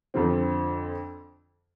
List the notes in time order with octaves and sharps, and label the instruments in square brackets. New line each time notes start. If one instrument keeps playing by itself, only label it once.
[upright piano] F2 D3 F3 C4